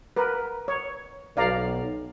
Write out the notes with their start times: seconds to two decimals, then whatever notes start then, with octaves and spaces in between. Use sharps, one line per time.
0.16 A#4 B4
0.68 C#5
1.37 B1 D5 F5 A#5